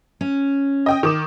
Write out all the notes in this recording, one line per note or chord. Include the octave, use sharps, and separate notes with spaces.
C#4
D#5 G5 D#6
D#3 D6 E7